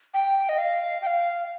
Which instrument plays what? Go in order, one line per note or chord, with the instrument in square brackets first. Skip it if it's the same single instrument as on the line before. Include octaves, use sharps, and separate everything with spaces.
[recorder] G5
D#5
F5
G5
F5